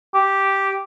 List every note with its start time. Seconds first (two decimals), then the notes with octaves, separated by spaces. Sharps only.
0.14 G4